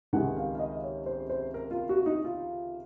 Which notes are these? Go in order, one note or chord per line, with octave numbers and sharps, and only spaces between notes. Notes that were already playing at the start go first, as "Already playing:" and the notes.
C#2 C3 D#3 G#3 F#5
F5
F5
D#5
C#5
C5
C5
A#4
F4
F#4
D#4
F4